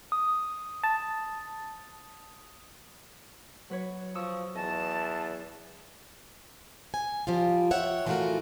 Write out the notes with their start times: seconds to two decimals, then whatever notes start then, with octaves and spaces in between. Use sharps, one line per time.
0.12 D#6
0.83 A5
3.70 F#3 B4 C#5
4.15 F3 C#6 D#6 E6
4.55 E2 D#5 A5
6.94 G#5
7.27 F3 G3 F4
7.71 C#5 E5 F#5 G5
8.06 E3 F3 A3 F4 F#4 A#4